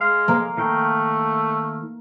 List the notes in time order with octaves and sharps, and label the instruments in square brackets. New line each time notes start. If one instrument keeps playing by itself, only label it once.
[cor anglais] G#3 [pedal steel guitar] F5
[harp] A#3
[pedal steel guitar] D#3 F5 G5 [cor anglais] A3